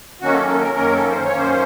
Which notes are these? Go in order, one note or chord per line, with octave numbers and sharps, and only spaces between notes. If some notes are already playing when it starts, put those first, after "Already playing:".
F#2 D#3 A#3 C#4 F#4
A4
A4
A#4
F#2 D#3 A#3 C#4 A#4
A4
C5
C#5
F#2 D#3 A#3 C#4
C5